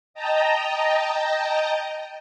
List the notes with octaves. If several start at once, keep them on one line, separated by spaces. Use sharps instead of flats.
D#5 G5 A5 A#5